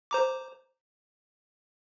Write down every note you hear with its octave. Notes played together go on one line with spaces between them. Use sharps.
C5 A#5 D6